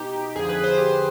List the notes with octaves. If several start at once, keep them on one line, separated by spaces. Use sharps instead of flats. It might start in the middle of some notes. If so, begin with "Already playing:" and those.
Already playing: B2 D#4 G4
F2 D3 F3 G#4
B4
C5
G4